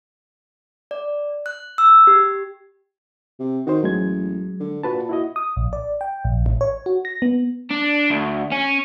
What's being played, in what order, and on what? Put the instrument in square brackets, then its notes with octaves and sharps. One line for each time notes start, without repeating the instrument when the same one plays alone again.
[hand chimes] D5
F#6
E6
G4
[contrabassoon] C3
[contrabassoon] D#3 [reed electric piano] F#4 C5
[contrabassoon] A1 [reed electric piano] F#3 G#3 G#6
[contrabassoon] D3
[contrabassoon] A#2 [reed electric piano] F#4 B4 A5
[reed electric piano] E4 F#4 D#5
[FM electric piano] D#6
A#1
D5
G5
A#1
A1
C#5
F#4
A#6
B3
[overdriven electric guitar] D4
D2
C#4